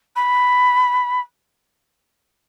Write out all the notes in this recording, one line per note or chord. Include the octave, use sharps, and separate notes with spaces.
B5